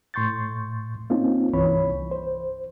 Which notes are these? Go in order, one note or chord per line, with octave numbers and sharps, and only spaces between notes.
A2 C6 C#6 G6 A6
A#3 C4 C#4 D#4 F4
C2 G2 E3 C#5 B5
C5